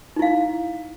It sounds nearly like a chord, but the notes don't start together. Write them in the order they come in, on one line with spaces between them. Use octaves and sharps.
D#4 E4 F5